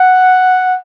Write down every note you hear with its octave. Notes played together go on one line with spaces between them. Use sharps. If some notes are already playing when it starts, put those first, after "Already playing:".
Already playing: F#5